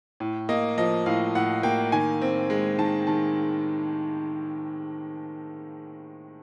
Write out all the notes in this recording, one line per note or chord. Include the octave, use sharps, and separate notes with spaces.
A2
A#3 D#5
F3 D#5
A2 F5
A2 F#5
A#3 G5
D#3 G#5
C4
G#3
D#3 A5
D#3 A5